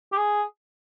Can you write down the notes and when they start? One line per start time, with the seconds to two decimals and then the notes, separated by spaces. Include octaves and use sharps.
0.12 G4
0.17 G#4